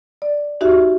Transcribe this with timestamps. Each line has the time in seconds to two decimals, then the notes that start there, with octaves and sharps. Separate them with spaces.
0.22 D5
0.61 D#4 F#4 G4 E5